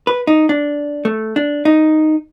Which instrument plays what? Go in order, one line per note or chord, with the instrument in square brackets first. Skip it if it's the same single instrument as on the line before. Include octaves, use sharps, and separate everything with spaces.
[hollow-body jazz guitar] B4
D#4
D4
A3
D4
D#4